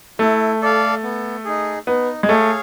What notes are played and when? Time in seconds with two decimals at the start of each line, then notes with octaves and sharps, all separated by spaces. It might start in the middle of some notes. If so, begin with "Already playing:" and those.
0.19 A3 E4
0.61 A4 D5 F5
1.03 B3
1.45 D#4 G#4
1.87 B3 D#4
2.23 G#3
2.29 A3 G#4 C#5 F5